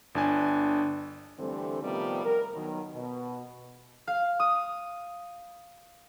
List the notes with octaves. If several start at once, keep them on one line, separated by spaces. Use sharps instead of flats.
G1 D4 G#5
D3 E3 G3 A3 C4
C3 D#3 F3 G3 A3 B3
A#4
B2 D#3 F#3
B2
F5
D#6